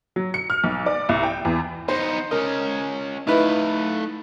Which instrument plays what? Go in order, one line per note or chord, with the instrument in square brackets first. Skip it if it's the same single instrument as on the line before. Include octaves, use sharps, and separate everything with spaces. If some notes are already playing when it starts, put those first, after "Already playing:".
[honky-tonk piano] F#3
C#7
F6
B1
D5
C2
G5
E2
[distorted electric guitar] B3 D#4 [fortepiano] C5
[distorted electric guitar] C#4 D#5 [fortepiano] A#4
[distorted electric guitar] A3 F5 [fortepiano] D#4 E4 B4